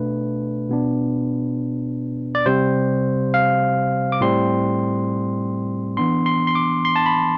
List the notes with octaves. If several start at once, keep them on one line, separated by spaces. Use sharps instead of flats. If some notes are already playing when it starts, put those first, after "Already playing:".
Already playing: B2 A3 D4 B4
B2 B3 D4
D5
C3 G3 C4 C5
F5
D6
A2 G3 C4 C6
E3 B3 D4 C6
C6
C6
D6
C6
A5
B5